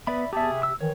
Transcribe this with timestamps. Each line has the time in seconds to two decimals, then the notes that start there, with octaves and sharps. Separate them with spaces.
0.07 B3 B4 D5 E5 B5
0.33 E2 G4 G#4 E5 A5
0.52 C3
0.63 E6
0.80 D#3 E3 C#5